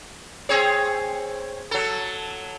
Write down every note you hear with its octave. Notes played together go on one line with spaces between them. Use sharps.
C4 G#4 C#5
F#3 A4